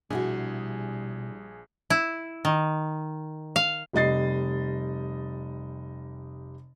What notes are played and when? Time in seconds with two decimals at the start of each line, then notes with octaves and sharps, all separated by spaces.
0.10 A#1 B2 G3 D4 E4 F#4 G#4
1.90 E4
2.45 D#3
3.56 F5
3.93 F1 G3 D#5 A6 C7